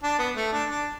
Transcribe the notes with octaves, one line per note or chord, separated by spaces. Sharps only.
D4
B3
A3
D4
D4